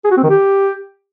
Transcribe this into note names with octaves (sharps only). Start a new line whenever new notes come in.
G#4
F#4
C4
D#3
G4